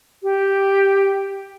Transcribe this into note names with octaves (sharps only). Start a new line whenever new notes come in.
G4